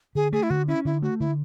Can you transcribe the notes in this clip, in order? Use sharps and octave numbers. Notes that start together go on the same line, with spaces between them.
D3 G#4
A3 G#4
E4
D3 F#4
C#4 E4
D3 E4
A3 F#4
D3 E4